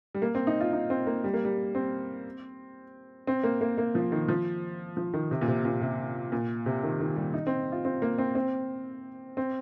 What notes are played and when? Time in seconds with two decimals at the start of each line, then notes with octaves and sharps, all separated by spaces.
0.15 G3
0.22 A#3
0.35 C4
0.47 D#4
0.61 F4
0.73 D#4
0.90 C4
1.07 A#3
1.24 G3
1.34 A#3
1.45 G3
1.75 C4
3.27 C4
3.44 A#3
3.61 A#3
3.78 A#3
3.95 F3
4.12 D#3
4.28 F3
4.97 F3
5.14 D#3
5.31 C3
5.42 A#2
5.48 C3
5.65 A#2
5.81 C3
6.32 A#2
6.66 C3
6.83 D#3
7.00 D#3
7.16 G3
7.34 D#4
7.47 C4
7.72 F4
7.85 C4
8.02 A#3
8.18 C4
8.35 C4
9.37 C4